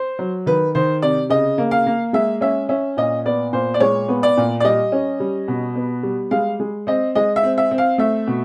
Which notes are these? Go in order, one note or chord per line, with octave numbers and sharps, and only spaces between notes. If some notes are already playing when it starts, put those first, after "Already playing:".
Already playing: C5
F#3
D#3 B4
D#3 C5
C3 D5
C#3 D#5
A#3
F5
A#3
G#3 E5
C#4 E5
C#4 E5
A#2 D#5
B3 D5
A#2 C5
D5
G#3 C#5
B3
D5
A#2
D5
G3 D#5
C#4
G3
B2
B3
G3
G#3 F5
G#3
C4 D#5
G#3 D#5
E5
C4
E5
C4
F5
A3 E5
B2